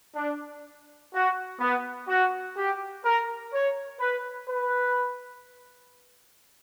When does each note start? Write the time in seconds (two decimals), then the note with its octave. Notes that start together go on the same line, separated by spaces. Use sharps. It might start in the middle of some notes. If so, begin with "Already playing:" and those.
0.16 D4
1.12 F#4
1.60 B3
2.08 F#4
2.56 G4
3.04 A#4
3.52 C#5
4.00 B4
4.48 B4